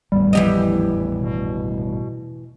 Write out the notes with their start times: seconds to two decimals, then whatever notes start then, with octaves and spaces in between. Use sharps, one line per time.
0.12 G#1 E2 A2 G3
0.33 E3 F3 G4 D#5
1.21 B2